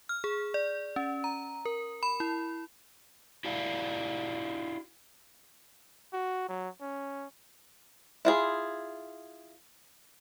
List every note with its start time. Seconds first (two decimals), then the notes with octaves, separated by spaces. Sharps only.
0.09 F6
0.24 G#4
0.54 D5
0.96 C#4
1.24 A#5
1.65 A#4
2.03 B5
2.20 E4
3.45 E4 F#4 G4 D5 F5
6.13 F#4
6.49 F#3
6.81 C#4
8.25 E4 F4 G#4